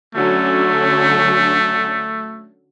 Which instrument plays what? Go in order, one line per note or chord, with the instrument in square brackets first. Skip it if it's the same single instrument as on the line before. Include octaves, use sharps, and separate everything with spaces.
[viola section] D3 F#3 C#4 [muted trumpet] A3